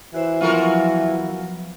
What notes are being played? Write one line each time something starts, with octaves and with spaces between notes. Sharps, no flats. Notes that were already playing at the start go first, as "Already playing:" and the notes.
E3 F#4 C5 E5
F3 F#3 B3 F4 F#4 A#4